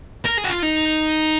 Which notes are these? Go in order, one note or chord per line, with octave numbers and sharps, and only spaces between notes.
A#4
G#4
F#4
F4
D#4